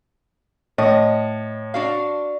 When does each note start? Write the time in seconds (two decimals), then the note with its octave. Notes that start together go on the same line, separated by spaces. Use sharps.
0.78 A2 D#5
1.74 D4 F#4 F5